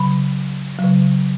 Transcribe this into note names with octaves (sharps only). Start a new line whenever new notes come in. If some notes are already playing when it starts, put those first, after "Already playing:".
Already playing: C#3 F#3 B5
F#3
C#3